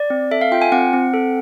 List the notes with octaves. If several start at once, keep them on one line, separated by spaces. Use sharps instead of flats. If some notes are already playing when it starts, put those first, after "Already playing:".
Already playing: D5
C4
A4 E5
F5
F4 G5
G#5
C4 F#5
C4
A4